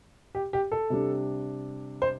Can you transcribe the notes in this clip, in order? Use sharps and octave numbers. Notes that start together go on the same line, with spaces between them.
G4
G4
A4
C3 G3 D4
C5